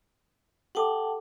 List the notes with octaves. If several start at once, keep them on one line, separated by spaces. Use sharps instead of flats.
G4 A4 F#5 G5 A5 D6